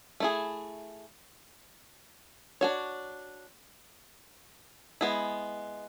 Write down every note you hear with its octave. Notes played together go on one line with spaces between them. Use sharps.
A3 E4 G#4
D4 F#4 C#5
G#3 B3 E4